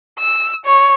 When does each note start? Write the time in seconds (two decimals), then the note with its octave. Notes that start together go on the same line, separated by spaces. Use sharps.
0.19 E6
0.66 C#5